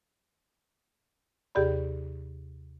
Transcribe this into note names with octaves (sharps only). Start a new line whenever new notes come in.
D#2 C3 G4 G#4 D5 B5